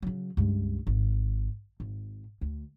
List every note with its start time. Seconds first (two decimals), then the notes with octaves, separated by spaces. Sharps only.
0.02 C#3 F#3
0.37 C#2 G2
0.87 G#1
1.80 G#1
2.41 D2